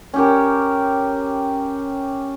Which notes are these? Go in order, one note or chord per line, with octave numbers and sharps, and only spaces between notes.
C#4 G4 A#4